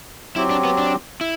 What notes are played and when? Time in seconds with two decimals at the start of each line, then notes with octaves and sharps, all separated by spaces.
0.36 F#3 C4 E4 G4
0.50 D4
0.64 B3
0.78 D4
1.21 E4